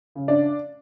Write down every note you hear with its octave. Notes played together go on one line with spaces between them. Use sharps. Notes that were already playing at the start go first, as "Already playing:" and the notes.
C#3
D4 D5